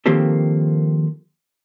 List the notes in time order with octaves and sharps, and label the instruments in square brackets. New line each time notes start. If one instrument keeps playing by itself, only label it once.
[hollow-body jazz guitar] D#3 F3 A#3 C4 G4 A4